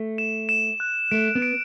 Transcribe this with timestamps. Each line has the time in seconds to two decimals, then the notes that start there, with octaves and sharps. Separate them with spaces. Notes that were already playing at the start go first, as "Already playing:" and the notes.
Already playing: A3
0.18 E7
0.49 E7
0.80 F#6
1.11 A3 D7
1.35 B3
1.42 D7